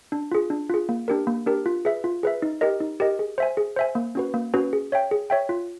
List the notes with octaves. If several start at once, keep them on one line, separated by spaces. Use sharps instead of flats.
D4
F4 G#4
D4
F4 G#4
A#3
D4 G4 A#4
A#3
D4 G4 A#4
F4
G#4 B4 E5
F4
G#4 B4 E5
D#4
G4 A#4 D#5
D#4
G4 A#4 D#5
G#4
C5 E5 G#5
G#4
C5 E5 G#5
A#3
C#4 F#4 B4
A#3
C#4 F#4 B4
G#4
C#5 E5 G5
G#4
C#5 E5 G5
F4